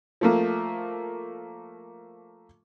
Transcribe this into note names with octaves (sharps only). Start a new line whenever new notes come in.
F3 A3 A#3